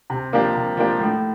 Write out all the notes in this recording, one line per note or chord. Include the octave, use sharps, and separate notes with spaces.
C3
F3 A#3 D4 G4
C3
F3 A#3 D4 G4
A2